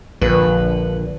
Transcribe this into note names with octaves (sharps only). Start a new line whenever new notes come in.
A#1 D3 B4